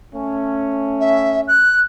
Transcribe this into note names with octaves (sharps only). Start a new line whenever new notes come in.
A3 C#4
E5
F#6